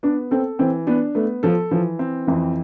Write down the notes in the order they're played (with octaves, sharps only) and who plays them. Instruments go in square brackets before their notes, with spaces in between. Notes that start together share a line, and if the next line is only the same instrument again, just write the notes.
[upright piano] B3 [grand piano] D4
[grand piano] C4 [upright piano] A4
[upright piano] E3 [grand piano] C4
[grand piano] B3 [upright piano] D4
[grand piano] A3 [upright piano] B3
[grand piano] F3 [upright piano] A4
[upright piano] E3 [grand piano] F3
[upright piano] C4
[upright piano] F2 [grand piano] E3